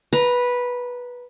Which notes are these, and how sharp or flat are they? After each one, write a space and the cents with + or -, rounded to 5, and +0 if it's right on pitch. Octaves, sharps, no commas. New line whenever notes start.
B4 -10 A#5 +10